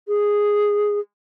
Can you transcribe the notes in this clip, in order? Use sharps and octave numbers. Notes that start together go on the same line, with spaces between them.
G#4